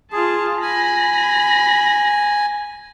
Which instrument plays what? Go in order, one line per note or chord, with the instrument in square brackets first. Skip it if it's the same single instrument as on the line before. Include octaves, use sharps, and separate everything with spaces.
[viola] F4 C6 [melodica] G#4 [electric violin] A5
[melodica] G#5 [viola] B5 [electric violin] A#6